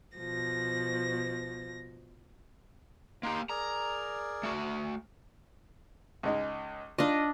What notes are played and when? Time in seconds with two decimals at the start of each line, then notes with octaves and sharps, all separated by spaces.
0.18 B2 F3 A#6
3.23 A#3 D#4 G4 C6
3.49 G#4 A#4 D5 A#5
4.43 A3 F#4
6.23 C#2 G#3 D#4
6.98 D4 D#4 F4 D5 D#5